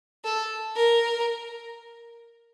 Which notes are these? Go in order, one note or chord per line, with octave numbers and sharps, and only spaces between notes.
A4
A#4